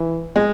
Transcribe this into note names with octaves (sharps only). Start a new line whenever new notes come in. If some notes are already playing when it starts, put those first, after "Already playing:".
Already playing: E3
G#3